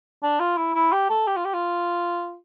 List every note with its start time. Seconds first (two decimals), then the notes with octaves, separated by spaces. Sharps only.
0.23 D4
0.40 F4
0.57 E4
0.74 E4
0.92 G4
1.09 A4
1.27 G4
1.36 F4
1.45 G4
1.54 F4